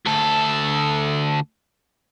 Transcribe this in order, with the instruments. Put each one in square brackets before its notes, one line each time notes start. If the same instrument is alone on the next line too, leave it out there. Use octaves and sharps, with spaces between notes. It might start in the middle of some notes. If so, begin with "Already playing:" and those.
[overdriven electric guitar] D2 A4